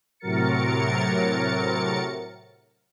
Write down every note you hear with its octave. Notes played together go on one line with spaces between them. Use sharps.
A2 C3 F#3 A#4 A6 C#7